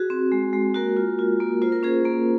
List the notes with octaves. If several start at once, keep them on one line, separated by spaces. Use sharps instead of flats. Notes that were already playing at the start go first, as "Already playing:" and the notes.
Already playing: F#4 G#4
C4
G#3
G#3
A#3 F#4 A#4
F4
F4
A#3
F4 C5
A#4
C#4 G#4 C5
A#3